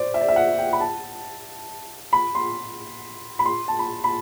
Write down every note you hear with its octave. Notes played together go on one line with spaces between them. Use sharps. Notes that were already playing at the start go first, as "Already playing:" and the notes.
Already playing: C5 D5
E5
D5
E5
F#5
G5
B5
A5
B5
C6
B5
C6
A5
B5
B5